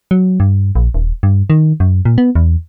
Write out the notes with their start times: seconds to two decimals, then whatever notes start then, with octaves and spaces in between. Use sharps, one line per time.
0.11 F#3
0.40 G2
0.75 A#1
0.94 D#1
1.23 G2
1.50 D#3
1.80 F#2
2.05 A#2
2.18 B3
2.35 E2